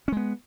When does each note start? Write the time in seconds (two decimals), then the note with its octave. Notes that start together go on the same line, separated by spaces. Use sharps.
0.08 C#4
0.12 G#3
0.17 B3